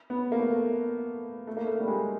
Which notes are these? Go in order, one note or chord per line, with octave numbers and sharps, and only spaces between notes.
B3
A#3
A3
A3
A#3
A3
G3
G#3